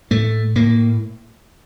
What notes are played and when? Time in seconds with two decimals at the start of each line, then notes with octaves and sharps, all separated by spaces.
0.11 A2 A3
0.55 A2 A#3